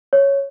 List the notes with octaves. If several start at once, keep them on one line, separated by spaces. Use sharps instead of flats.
C#5